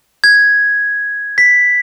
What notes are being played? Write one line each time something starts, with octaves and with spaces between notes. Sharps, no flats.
G#6
B6